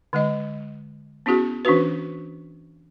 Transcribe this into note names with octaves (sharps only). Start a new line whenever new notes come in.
D3 G#3 D#5
B3 C#4 E4 F#4 G#4
E3 C#4 D4 F#4 B4